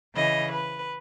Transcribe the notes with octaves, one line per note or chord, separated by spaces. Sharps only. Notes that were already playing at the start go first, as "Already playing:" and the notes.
C#3 E3 D#5
B4